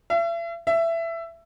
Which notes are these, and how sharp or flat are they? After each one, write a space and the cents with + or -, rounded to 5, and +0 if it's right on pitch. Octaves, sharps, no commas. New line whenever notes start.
E5 +40
E5 +15